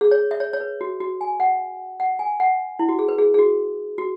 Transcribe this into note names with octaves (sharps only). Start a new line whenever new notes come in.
G#4
C#5
E5
C#5
C#5
B4
F#4
F#4
G#5
F#5
F#5
G#5
F#5
E4
F#4
G#4
B4
G#4
G#4
F#4
F#4